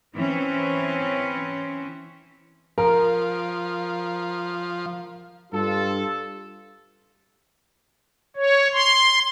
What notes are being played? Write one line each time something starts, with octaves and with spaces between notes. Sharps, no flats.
E3 C4 C#4
F3 A#4
G2 F4 A4
C#5
C6